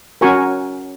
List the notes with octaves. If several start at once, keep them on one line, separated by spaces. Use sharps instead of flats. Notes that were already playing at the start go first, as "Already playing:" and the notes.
C#4 F#4 A#4 G#5 C#6